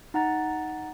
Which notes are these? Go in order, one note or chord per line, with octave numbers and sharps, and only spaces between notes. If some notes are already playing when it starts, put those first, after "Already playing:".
D#4 F#5 A#5 A6